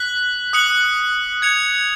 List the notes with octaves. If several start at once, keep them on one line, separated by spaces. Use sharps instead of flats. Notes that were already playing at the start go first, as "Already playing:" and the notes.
Already playing: F#6 B6 F#7
D#6 F#6 C#7 F#7
G#6 C#7 F7